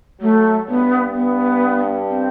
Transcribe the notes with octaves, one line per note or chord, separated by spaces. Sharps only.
F#3 A3
G2 B3
B3
C4